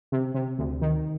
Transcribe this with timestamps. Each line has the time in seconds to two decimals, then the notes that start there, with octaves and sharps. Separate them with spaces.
0.12 C3
0.34 C3
0.58 D2
0.81 D#3